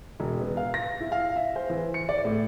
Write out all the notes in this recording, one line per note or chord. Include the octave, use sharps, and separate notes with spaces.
E1
B3
F5
A#6
E4
F5
E5
C5
E3
C#7
D5
A2